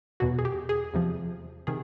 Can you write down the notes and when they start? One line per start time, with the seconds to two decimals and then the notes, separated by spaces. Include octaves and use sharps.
0.20 E2 B2 F#3 F#4
0.39 G#4
0.45 G4
0.69 G#4
0.94 E2 C3 F3
1.67 C3 D#3 G#4